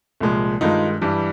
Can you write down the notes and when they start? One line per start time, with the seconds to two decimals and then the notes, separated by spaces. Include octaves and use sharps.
0.20 C2 A#2 F3 G#3
0.61 G2 D#3 G#3 D#4 F4
1.02 G2 E3 G3